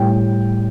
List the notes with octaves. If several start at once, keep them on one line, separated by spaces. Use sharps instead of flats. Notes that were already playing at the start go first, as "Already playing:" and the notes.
Already playing: A2 G3 G5